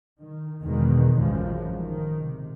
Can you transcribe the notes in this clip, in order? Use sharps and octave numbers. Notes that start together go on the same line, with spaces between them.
D#3
E2 B2 D#3 G#3
A1 F#2 F3 G#3
D#3
C3